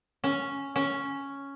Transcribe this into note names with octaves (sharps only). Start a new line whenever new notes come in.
C#4
C#4